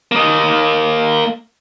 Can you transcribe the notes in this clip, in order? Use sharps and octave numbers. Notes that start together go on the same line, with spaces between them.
A#3 D#5